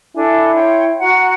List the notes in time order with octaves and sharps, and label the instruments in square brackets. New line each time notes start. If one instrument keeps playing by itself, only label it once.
[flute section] D4 A4 G#5 [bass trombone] E4
[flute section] C#5 G5 C6
F#4 F#5 A#5